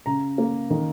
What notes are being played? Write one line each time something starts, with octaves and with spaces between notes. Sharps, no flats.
C#3 A#5
A#3
D#3